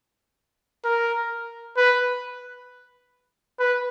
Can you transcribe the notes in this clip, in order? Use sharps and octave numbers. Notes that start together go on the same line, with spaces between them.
A#4
B4
B4